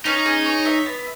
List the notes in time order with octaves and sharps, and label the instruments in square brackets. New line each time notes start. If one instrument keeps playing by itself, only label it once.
[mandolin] C#4 [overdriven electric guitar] D#4
[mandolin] G#4
C#5
E5
B3